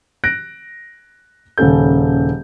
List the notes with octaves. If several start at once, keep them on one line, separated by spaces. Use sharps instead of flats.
F#6 A#6 D7
D#1 C#3 C#4 A4 G6